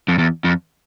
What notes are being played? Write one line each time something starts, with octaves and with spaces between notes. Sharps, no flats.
F2
E2
F2